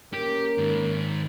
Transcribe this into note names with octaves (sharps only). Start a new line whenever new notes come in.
A#3 C#4 G4 A#4
G#2 D#3